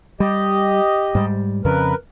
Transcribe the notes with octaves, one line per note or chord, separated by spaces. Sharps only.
G3 G4 D#5
G#2 G3
F2 C#3 A#4 B4